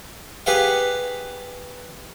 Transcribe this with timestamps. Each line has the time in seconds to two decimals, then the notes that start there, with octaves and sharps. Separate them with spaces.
0.46 G4 G#4 B4 F5 F#5